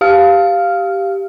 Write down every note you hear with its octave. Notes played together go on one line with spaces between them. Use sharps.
G4 F5 F6